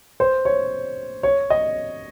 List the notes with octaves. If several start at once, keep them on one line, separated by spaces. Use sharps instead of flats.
C5
C#5
C#5
D#5